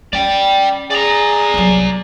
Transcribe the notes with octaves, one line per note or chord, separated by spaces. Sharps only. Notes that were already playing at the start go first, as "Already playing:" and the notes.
C#4 D5 G5
G#4 D5 A#5
C2 F#3